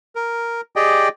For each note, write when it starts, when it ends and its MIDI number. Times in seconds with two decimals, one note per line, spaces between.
0.15 0.61 70
0.76 1.09 67
0.76 1.09 68
0.76 1.09 74
0.76 1.09 75
0.76 1.09 79